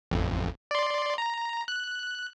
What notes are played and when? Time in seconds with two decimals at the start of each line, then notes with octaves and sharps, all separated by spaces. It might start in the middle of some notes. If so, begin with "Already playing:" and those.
0.11 A1 F2
0.71 D5 C6
1.18 A#5
1.68 F#6